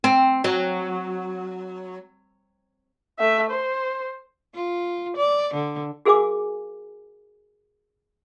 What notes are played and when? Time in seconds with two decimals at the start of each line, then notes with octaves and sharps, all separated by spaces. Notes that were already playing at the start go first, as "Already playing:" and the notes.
0.04 C4
0.44 F#3
3.19 A3 E5
3.51 C5
4.55 F4
5.17 D5
5.54 D3
6.05 F#4 G#4 A#4 F5 G#5 D6